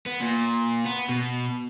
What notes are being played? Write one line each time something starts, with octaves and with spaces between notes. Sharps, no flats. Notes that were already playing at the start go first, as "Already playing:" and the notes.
B3
A#2
B3
B2